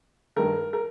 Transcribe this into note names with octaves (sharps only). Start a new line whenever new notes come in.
G2 D#3 A#4
A#4